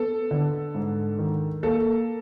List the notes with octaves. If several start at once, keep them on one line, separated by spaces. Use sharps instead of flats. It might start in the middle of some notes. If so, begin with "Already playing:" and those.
Already playing: B3 A4
D3
G#2
D#3
A#3 A4